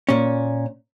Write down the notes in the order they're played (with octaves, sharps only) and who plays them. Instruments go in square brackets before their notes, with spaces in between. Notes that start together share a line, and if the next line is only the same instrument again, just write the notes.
[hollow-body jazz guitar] A#2 C#4